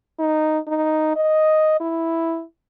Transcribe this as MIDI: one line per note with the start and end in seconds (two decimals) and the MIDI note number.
0.19 0.59 63
0.67 1.12 63
1.16 1.77 75
1.80 2.43 64